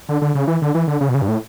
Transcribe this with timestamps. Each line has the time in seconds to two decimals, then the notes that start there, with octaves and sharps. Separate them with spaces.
0.09 D3
0.22 D3
0.35 C#3
0.47 E3
0.62 D3
0.75 E3
0.87 D3
1.01 C#3
1.09 B2
1.14 C#3
1.22 G2
1.28 A2